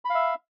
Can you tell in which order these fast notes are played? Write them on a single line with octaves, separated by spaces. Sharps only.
B5 F5 E5